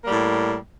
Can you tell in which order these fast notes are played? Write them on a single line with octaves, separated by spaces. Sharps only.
A#3 G3 A2